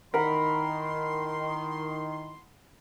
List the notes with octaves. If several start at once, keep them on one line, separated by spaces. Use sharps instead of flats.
D#3 E4 A#4 F#5 B5 C6